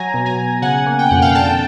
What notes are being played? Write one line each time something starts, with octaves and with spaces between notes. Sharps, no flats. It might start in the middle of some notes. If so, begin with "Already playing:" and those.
Already playing: F#3 G#5 A#5
B2
G#5 A#5
B2
C#3 F#5 G#5
A#3
G5
F2 F#5
F5 G5
D3 G5 A5